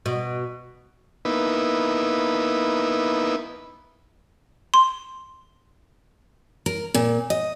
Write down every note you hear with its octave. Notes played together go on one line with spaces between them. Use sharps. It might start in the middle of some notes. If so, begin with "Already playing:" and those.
B2
A#3 B3 D#4 E4 B4
C6
A#4
A#2
D#5